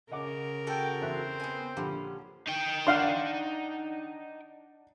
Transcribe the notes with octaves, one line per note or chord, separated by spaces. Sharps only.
C#3 A#4 D#5 F#5 D6
F#4 A4 G5
E2 C4 C5 E5 F#6
B3 G#5
A#1 D3 G3 C#4 F#5
D#4 G5
D4 F5 F#5 C6